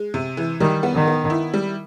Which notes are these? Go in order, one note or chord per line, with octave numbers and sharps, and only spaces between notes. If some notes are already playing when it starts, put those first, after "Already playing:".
Already playing: G#3
C3
E3
D#3 G3
B3
D#3
B3
E4
G3